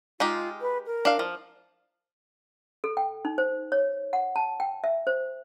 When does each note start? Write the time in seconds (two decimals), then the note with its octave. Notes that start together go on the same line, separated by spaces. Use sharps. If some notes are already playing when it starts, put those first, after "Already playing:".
0.20 G#3 D#4 F4 G4
0.61 B4
0.86 A#4
1.05 D4 F5
1.19 F3
2.84 A4
2.97 G5
3.25 D#4
3.38 C5
3.72 C#5
4.13 F#5
4.36 A5
4.60 G5
4.84 E5
5.07 C5